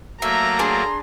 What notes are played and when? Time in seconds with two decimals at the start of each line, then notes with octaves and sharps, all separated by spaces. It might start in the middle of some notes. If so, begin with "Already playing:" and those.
0.22 F#3 A3 A#3 E5 A#5
0.59 D4 G#4 D5 C6